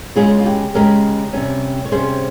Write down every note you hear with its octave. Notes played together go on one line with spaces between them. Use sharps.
C#3 G#3 C#4 F4 G#4
F4
G4
C#3 G#3 C#4 G4 A#4
C3 G3 C#4
C#5
C3 G3 C#4 G#4 C5